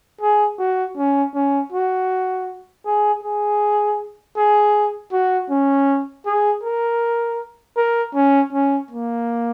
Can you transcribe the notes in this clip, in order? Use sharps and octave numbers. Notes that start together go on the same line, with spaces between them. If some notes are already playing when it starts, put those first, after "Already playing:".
G#4
F#4
C#4
C#4
F#4
G#4
G#4
G#4
F#4
C#4
G#4
A#4
A#4
C#4
C#4
A#3